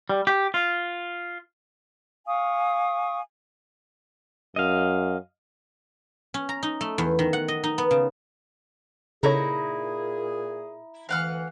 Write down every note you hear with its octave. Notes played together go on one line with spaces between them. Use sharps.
G3
G4
F4
F5 G#5 C#6 D#6
F#2 D#5 F5
C#4
A#5
D#4
A3
E2
D#3
F#5
D#5
D#4
B3
C#3
A#2 C#3 D#4 E4 G#4 A4 C#5 A#5
D2 E3 F5 F#5 F6